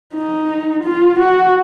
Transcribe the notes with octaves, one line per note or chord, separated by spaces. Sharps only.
D#4
F4
F#4